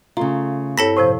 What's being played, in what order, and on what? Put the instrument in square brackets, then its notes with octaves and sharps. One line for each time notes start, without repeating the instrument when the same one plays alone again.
[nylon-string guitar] C#3 A3 F4 [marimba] A#5
[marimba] G2 E4 C#5 [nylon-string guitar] C4 [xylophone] A4 A5 B6
[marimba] A2 C3 F3 [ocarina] C5